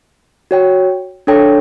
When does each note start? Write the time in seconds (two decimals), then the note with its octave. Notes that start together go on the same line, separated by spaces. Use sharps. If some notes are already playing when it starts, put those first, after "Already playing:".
0.51 F#4 C#5 G5
1.27 D4 A4 C#5 G5